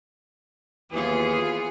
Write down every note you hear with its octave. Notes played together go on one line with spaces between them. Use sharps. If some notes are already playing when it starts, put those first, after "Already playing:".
D#2 E3 B3 F4 G#4